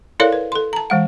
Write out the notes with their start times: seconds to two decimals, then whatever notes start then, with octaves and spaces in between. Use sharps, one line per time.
0.20 E4 A4 A#4 C#5 D5 F5
0.33 B4
0.52 A4 C6
0.73 A5 A#5
0.90 E3 G#3 F#5